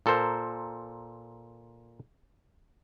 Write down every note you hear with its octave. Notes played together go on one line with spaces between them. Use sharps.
A#2 A4 A#4 C5